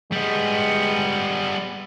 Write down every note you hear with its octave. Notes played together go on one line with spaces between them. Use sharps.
G3 G#3 B3